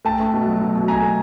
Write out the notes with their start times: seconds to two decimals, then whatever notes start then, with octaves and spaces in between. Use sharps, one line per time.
0.05 A3 G5 A5
0.20 A3
0.34 B2
0.47 F#3
0.61 B2
0.75 B2
0.88 B2 G#5 A#5
1.02 A3